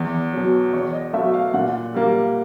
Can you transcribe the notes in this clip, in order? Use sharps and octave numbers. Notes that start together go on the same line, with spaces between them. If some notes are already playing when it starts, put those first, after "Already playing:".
Already playing: E2
B2 F#3
E2 C#5
D#5
B2 F#3 A3 E5
F5
A#2 F#5
G3 A#3